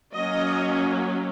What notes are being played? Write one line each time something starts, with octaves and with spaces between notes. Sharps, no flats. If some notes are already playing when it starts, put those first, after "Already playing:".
F#3 A#3 C#4 D#5